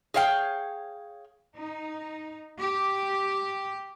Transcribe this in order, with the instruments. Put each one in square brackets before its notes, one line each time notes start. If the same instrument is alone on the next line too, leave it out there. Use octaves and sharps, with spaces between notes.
[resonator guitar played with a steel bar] G#4 C#5 F5 G5
[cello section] D#4
G4